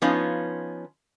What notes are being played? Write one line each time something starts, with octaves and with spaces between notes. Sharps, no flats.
F3 B3 C#4 D#4 F4